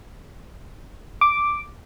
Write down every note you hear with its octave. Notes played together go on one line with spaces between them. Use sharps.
D6